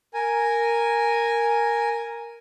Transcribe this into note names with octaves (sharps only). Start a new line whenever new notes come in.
A#4 G#5